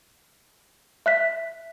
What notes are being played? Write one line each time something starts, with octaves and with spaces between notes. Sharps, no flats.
E5 F#6 B6